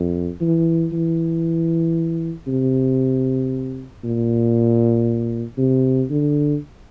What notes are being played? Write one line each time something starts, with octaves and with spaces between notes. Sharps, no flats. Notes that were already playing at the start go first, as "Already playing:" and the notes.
Already playing: F2
E3
E3
C3
A#2
C3
D3